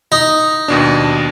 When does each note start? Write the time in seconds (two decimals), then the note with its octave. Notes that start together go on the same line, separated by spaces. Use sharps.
0.12 D#4
0.68 D#2 B2 D4